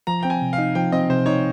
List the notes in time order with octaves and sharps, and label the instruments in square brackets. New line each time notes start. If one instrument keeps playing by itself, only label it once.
[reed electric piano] F3 [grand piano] A#5
[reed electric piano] C4 [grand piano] G5
[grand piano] G#5
[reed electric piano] C3
[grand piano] F5
[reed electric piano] D#4
[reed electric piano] F3 [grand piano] G5
[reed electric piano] C4 [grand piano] D#5
[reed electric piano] C3 [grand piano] C5
[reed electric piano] D#4 [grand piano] C#5